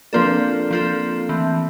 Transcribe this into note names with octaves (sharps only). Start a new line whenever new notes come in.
F3 A#3 C4 D4 F4 A4
F3 C4 F4 A4
E3 A3 C4